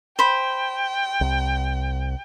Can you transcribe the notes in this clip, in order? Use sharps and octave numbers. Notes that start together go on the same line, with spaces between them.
C5 G5 B5
C2